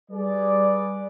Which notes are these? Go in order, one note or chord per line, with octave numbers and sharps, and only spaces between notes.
G3 G#4 B4 D5